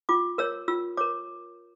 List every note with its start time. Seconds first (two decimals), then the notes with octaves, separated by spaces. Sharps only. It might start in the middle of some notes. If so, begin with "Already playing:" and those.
0.09 F4 D6
0.38 A#4 C#5 E6
0.68 F4 E6
0.97 A#4 C#5 D6